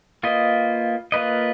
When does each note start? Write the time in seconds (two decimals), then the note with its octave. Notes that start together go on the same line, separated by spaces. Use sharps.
0.23 A#3 F4 B4 D#5
1.12 A#3 F4 B4 D#5